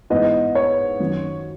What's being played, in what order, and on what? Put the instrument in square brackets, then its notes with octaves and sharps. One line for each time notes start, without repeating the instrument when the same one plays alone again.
[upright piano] G#2 E3 B3 [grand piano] D#5
[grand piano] C#5
[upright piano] F#2 D#3 F#3